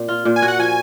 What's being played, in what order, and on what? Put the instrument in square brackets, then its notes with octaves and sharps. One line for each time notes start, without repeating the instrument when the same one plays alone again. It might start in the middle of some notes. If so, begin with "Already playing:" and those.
Already playing: [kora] A#2 C4
F4
A#2
[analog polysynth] G#5
[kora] F#4
[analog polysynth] F#5
[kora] F3 [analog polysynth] G#5